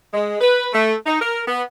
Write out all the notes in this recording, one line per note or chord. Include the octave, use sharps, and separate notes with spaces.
G#3
B4
A3
D#4
A#4
B3